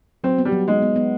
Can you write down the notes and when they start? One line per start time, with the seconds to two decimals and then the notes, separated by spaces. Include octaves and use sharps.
0.24 F#3 C4
0.38 B3
0.45 G3
0.52 F#3
0.67 G#3 D#4
0.82 B3
0.96 B3